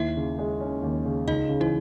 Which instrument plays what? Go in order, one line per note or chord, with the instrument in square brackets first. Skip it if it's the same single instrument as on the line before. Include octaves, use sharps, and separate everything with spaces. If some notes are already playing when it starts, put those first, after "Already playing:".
Already playing: [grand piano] D#2 [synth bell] E4 E5
[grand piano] C#3
G#3
C#4
D#2
C#3
[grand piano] C#2 [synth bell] D#4 D#5
[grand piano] C#3
[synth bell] E3 E4